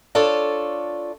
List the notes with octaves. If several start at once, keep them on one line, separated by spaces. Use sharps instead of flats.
D4 F4 A4 C#5 D5